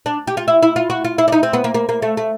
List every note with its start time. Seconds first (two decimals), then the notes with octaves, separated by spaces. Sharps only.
0.06 D4
0.27 G4
0.37 F4
0.48 E4
0.63 E4
0.76 F4
0.90 F#4
1.05 F4
1.18 E4
1.28 D4
1.32 D#4
1.43 C4
1.53 B3
1.64 A#3
1.74 A#3
1.89 A#3
2.02 A3
2.17 A3